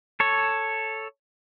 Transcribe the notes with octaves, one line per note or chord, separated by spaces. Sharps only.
A4 C#5